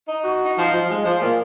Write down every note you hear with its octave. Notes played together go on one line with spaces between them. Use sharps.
D#4
F#4
D#4
F3
F3
G#3
F3
A#2